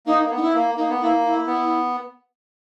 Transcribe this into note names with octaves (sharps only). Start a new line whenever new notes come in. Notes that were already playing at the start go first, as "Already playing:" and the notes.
A#3 D#4
A#3
B3
D#4
E4
A#3
A#3 D#4
B3
A#3 E4
E4
B3